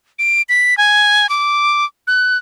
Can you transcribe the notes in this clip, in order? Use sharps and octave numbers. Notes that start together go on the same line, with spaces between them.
D7
B6
G#5
D6
F#6